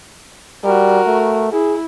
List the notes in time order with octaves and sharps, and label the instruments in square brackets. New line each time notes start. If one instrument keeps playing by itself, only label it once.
[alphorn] G3 [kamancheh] F#4 A#4
[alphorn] A3
[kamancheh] E4 [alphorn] G#4